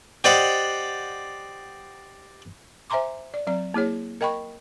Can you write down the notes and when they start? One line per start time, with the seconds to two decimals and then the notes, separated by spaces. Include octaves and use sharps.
0.24 G4 C5 D5 D#5 F#5
2.90 C5 E5 G#5 A#5 C6 D6
3.34 D5
3.47 F#3 C4 D5
3.74 A#3 E4 G#4 C#5
4.21 A#4 D#5 G5 B5 C#6